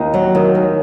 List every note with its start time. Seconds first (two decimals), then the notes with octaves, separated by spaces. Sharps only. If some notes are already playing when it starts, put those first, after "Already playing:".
Already playing: D#2 D#4
0.14 F#3
0.35 D#3
0.55 D#2